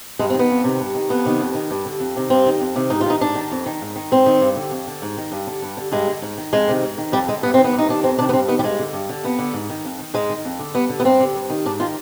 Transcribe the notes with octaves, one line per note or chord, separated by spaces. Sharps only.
G2 G#3
C4
D#3 B3
F2
C3 D#3
G2
D#3
F2 B3
C3 D#3
F2
D#3
G2
D3
F2
C3 D#3
G2 C4
D#3
F2
C3 D#3
G#2 D#4
F4
D#3 D#4
G#2 D4
D#3
F2
D#3
G#2
D#3
G#2 C4
D#3
G2
D3
F2
D3
G#2
D#3
G2
D3
G2
D3
G2 G#3
D3
G#2
D#3
F2 G#3
C3 D#3
G#2
D#3
F2 G3
D3 G#3
G2 B3
D#3 C4
B3
G2
D#4
D#3 D4
F2 C4
C3 D#3 D4
B3
G2 C4
D#3 B3
G3
G2 G#3
D3
G2
D3
F2 B3
D3
G#2
D#3
F2
D#3
G#2 G#3
D#3
F2
D3
G2 B3
D3
B3
G2 C4
D3
G2
D#3
G#2 D4
D#3 F4